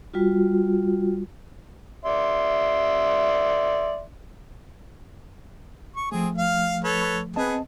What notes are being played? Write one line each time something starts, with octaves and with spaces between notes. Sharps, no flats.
G3 F4 F#4
D5 E5 C6
C#6
F3 A3 C4 G#4
F5 F6
A4 B4 C#5
B3 C4 G#4 B4 D#5 A5